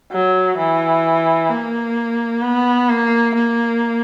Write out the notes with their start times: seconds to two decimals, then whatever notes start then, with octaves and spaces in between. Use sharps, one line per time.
0.12 F#3
0.58 E3
1.50 A#3
2.43 B3
2.90 A#3
3.35 A#3